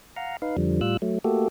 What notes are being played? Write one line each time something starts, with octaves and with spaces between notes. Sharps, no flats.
F5 F#5 A#5
D#4 B4 F5
F2 D3 F3 G3
A2 G3 F4 E6 F#6
F#3 A3
A3 A#3 F#4 G4 A4